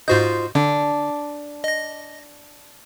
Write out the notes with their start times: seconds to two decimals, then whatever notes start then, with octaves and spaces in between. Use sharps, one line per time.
0.08 G#2 F4 F#4 C5 D#5 G6
0.55 D3 D4
1.64 D#5 A#6